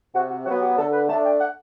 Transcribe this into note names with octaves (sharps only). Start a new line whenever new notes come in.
C3 F#4
F#4
F#3 B3 F#4
G4
D3 A4
B4
A3 D4 A5
G5
F#5